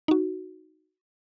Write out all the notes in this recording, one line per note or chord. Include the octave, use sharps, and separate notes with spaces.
D#4 F#4